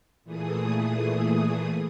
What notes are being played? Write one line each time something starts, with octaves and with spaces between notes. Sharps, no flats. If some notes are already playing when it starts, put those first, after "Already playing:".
A#2 E3 A3 G#4 D#6